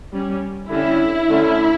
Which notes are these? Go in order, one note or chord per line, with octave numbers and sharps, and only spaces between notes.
G3 C#4
D3 G3 C#4 E4
D3 A3 C#4